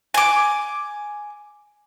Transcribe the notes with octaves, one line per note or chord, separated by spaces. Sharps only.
G#5 D6